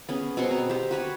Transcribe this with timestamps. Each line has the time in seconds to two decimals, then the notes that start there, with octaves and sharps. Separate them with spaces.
0.09 B3 C#4 G#4
0.37 B2 C4 C6 C#6
0.51 A#5
0.70 G4 C5
0.91 F#4 B4 C#5